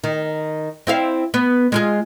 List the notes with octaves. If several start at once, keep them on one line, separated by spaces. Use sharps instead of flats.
D#3
C4 E4 F5
B3
G#3 F4 G#4